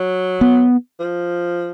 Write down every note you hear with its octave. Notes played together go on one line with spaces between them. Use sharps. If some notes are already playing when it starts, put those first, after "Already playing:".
Already playing: F#3
B3
F3